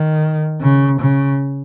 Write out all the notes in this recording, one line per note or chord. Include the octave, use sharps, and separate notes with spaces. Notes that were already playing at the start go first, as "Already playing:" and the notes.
Already playing: D#3
C#3
C#3